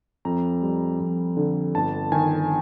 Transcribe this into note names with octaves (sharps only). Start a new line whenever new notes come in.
F2 A#5
G3
F2
D3
G1 A5
D#3 G#5